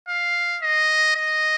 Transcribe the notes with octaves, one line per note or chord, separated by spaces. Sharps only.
F5
D#5
D#5